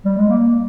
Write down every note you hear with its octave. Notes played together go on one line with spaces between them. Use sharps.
G3
G#3
A#3